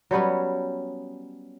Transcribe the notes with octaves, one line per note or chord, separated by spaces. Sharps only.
F#3 G3 B3 C#4